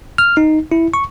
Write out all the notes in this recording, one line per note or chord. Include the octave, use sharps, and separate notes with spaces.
F6
D#4
E4
C#6